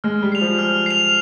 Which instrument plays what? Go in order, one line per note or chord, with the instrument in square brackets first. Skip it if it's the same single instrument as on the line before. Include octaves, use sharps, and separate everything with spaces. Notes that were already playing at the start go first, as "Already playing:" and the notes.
[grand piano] G#3 [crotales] F6
[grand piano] G3
[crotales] C7 F7
[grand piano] F3
[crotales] F6
C7 F7